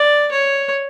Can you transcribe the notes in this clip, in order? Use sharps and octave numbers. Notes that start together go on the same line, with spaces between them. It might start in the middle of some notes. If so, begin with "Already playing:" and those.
Already playing: D5
C#5